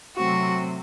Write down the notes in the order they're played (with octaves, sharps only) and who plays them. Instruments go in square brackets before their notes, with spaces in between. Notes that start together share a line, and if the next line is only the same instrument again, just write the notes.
[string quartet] C3 F#3 A3 C4 F#4